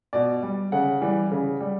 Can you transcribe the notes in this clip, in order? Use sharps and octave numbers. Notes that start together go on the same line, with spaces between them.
B2 D5
G3
C#3 F#5
E3 G3
C#3
G3